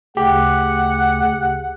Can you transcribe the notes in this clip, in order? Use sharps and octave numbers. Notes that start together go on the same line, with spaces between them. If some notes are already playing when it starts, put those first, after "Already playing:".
D2 C#3 G4 F#5